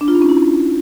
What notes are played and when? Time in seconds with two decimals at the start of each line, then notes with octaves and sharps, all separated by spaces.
0.01 D4
0.08 F4
0.15 D#4
0.22 C#4
0.29 E4